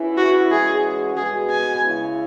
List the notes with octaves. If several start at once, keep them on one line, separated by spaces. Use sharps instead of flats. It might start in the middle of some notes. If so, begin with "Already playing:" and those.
Already playing: E2 E3 C#4 E4
F#4
E3 G#3 C#4 F#4 G#4
B2 G#3 B3 F#4 G#4 B4
G#5
C#3 G#3 E4